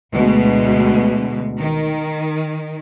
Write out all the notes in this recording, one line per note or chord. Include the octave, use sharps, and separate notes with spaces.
D2 B2 G#3
D#3